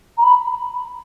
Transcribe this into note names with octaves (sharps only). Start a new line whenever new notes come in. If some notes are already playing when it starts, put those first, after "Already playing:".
A#5
B5